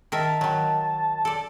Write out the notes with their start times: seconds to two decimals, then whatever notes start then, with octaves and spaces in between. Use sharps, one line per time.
0.12 D#3 A#4 E5 A5
0.41 D#3 F#3
1.25 A4 D5